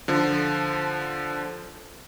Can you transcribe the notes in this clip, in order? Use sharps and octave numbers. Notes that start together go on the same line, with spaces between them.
D3 F3